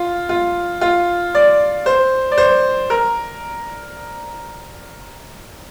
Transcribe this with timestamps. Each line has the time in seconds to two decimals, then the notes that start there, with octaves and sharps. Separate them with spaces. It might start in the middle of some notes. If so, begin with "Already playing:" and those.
Already playing: F4
0.29 F4
0.81 F4
1.35 D5
1.86 C5
2.32 D5
2.38 C5
2.90 A#4